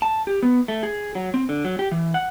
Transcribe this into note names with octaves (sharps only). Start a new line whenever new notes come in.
A5
G4
B3
A3
G#4
F#3
C4
D3
F#3
G4
E3
F#5